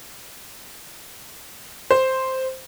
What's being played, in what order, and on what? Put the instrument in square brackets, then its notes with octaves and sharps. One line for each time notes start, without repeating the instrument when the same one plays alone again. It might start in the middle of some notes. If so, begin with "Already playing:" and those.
[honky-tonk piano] C5